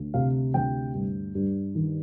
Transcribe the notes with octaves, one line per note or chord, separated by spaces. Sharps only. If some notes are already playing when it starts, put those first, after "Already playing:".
Already playing: D2
C3 F5
D2 G5
G2
G2
D#3